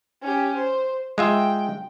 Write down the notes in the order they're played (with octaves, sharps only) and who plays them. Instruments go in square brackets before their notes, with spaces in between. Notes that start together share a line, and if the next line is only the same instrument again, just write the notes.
[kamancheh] C#4 G4
C5
[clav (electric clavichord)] G#3 F4 E5 [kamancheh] G5